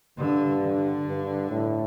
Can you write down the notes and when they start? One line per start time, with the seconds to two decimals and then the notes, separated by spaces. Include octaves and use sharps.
0.19 G2 D3
0.63 D3
1.07 G2
1.51 A2